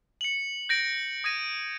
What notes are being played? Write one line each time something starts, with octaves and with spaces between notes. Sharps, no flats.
C#7 F#7
G6 A#6 D7
D#6 G#6 A#6 D#7